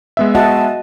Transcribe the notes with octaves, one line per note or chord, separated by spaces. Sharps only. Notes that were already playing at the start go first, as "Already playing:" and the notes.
G#3 B3 E5
F#4 D#5 F#5 A5